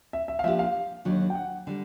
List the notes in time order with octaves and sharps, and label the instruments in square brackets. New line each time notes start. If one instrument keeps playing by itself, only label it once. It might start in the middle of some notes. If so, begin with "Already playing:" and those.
[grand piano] E5
E5
F5
[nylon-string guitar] F3 A#3 D4 G4 [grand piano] E5
[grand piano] F5
[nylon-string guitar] D#2 D3 F#3
[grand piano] G5
F#5
[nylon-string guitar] D3 G3